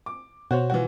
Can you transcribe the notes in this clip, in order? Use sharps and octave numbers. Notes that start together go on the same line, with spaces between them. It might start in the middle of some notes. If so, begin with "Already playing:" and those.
D6
B2 F#4 C5 C#5
E3 F3 F#4